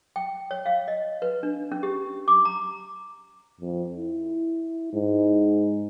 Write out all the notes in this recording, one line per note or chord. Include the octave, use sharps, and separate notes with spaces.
G5
C#5
F5
D#5
B4
D4
C#4
G4
D6
A#5
F2
E4
G#2